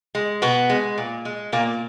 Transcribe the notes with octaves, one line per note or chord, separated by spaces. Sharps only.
G#3
B2 B3
G#3
A#2
G#3
A#2 A#3